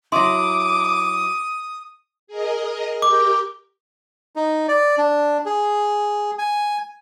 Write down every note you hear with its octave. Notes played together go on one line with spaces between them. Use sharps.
F#3 E4 E5 C6 D6 D#6
G#4 A#4 D#5
G4 A#4 G5 D6
D#4
D5
D4
G#4
G#5